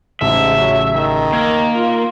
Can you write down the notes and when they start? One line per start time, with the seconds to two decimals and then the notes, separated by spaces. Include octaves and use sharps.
0.21 A1 G#2 C#3 E5 A5
0.57 F#3
0.95 D#3
1.33 A#3 E6 G#6
1.76 F4